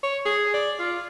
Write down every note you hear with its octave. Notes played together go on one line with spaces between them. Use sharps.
C#5
G#4
D5
F4